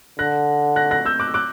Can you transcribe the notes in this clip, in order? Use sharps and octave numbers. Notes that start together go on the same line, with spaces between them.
D3 F#6 A#6
F#6 A#6
F#6 A#6
E6 G6
D6 F#6
D6 F#6